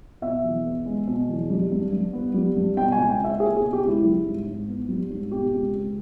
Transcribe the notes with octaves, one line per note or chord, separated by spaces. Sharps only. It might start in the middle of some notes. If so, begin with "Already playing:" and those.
B2 E5
E2
B3
G#3
B2
E2
G3
G2
G2
B3
G3
G2
B2 G5
G#5
C#2
G5
C#2 E5
A#3 G#4
G#4
B2
G4
C#2 E4
G3
G#2
G#2
B3
G3
G#2
B2 G4
C#2
C#2